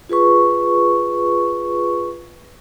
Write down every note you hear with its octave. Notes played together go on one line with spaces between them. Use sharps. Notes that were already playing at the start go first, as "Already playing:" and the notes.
F4 G#4 B4 C#6